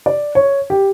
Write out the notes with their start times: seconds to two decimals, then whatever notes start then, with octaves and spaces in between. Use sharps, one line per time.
0.06 D5
0.35 C#5
0.70 G4